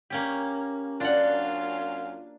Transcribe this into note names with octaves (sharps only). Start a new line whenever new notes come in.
A#3 C#4 G4
F#2 D4 F4 F#5